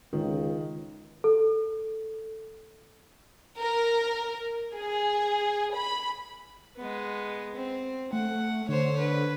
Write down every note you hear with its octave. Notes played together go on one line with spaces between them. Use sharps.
C#2 D#3
A4
A#4
G#4
B5
G#3 B3
C4
A3 F#5
D3 C5 C#5
B4